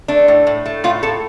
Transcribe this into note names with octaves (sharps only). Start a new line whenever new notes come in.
A3 D4
A2
A2
A3
A2 F4
A2 A4